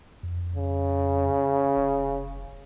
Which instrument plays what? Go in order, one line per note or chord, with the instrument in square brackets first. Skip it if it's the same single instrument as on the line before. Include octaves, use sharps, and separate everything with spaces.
[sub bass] F2
[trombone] C#3
[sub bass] F1